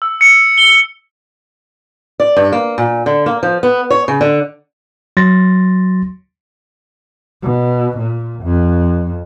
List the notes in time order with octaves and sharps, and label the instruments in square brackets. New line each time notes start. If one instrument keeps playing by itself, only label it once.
[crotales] E6
C#7
G7
[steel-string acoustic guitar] D5
G2
A#3
A#2
D3
A#3
F3
B3
C#5
C#3
D3
[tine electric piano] F#3 C6 A6 A#6
[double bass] B2
A#2
F2